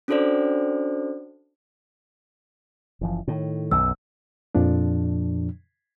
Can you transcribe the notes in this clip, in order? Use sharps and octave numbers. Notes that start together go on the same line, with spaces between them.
C#4 D4 F#4 A4 C5 D5
F#1 E3 F3
A2 D#3
B1 F#2 E6
F2 A#2 F3 D4